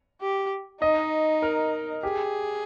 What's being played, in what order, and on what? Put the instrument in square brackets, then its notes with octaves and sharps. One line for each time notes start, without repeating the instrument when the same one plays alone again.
[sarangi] G4
[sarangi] D#4 [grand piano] D#5
[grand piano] A#4
[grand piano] G4 [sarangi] G#4